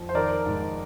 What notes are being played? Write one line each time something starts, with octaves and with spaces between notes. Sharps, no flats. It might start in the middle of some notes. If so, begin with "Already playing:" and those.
Already playing: F2
C5
D#3 A#4 D5
G#2